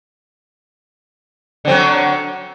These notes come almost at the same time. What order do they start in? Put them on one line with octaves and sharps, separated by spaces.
D3 C4 F#3